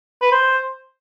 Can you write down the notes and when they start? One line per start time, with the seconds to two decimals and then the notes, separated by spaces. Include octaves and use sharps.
0.22 B4
0.32 C5